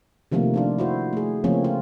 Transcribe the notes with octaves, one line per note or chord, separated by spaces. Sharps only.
C3 D#3 F3 A3 A#3
F3 D4 F4
E4 F#4 C5
A3 G#4
C#3 F3 A3 A#3 C4 C#4
F4